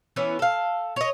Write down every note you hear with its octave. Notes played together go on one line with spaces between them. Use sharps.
E3 B3 C#4 E4
A4 F5
C#5 D#5